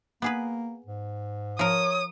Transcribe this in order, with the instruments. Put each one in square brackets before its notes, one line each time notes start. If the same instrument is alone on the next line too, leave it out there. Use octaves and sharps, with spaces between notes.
[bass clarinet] A#3 [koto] B3 G#4 B4
[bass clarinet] G#2
[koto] F3 A#4 [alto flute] C#5 [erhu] D#6